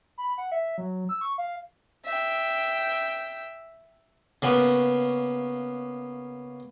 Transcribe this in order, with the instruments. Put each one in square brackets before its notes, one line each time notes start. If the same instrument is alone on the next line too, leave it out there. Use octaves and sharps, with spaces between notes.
[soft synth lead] B5
F#5
E5
F#3
E6
C#6
F5
[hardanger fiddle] E5 G5
[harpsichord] C#3 A#3 B3